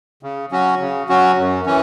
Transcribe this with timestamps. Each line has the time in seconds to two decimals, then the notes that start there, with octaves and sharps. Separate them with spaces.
0.23 C#3
0.52 F#3 C#4 F#4
0.81 C#3
1.09 F#3 C#4 F#4
1.38 F#2
1.66 E3 C#4